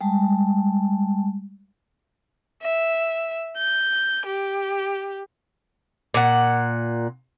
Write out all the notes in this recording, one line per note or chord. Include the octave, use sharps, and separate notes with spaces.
G3 G#3 A5
E5
G6
G4
A#2 F#5